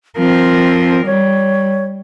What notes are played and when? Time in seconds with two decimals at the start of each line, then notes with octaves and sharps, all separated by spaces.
0.18 F3 C4 A#4
1.06 G3 C#5